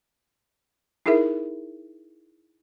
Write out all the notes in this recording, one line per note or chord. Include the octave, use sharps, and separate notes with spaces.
D#4 E4 G#4 A#4 E5